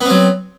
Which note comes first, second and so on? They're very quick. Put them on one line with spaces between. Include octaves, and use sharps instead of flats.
B3 C4 F#3